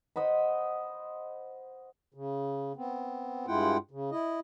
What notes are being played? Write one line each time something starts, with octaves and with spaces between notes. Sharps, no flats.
C5 D#5 F#5 B5
C#3
B3 C4
G2 G#3 E4 F4 F#5 G5
C#3
E4 D#5